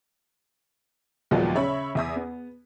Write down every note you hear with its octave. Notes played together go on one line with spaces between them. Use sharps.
D#2 A#2 F3 F#3 G#3 B3
C#3 C#5 E5 B5
E2 E5 D#6
B3